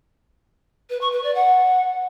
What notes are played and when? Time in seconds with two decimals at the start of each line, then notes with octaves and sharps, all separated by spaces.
0.90 B4
1.01 C#6
1.12 B4
1.23 D5
1.35 F#5